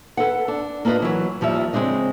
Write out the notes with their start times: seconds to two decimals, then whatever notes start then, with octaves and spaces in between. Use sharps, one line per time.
0.17 A4 B4 F#5
0.48 D4
0.85 A#3 D4 F4 B4 D#5
1.02 E3 F#3
1.41 D#2 F3 G3 E5
1.73 C#3 G#3 C4 D4 D#5